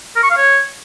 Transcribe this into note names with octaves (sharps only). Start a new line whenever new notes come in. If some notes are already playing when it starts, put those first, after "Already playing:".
A#4
C#6
F5
C#5